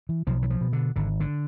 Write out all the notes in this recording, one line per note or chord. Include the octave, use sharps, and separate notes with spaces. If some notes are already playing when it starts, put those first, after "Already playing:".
E3
B1 F3
E3
F3
B2
D3
G#1 D3
D3